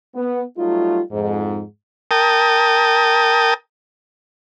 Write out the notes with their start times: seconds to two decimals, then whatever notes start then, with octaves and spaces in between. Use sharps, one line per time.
0.15 B3
0.58 F#3 G3 A3 D#4 F4
1.12 F2 G#2
2.11 A#4 G5 A5 D#6